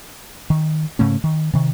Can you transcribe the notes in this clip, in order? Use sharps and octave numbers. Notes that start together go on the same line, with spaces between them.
D#3
G#2 C#3 A3 C#4
D#3
C3 D#3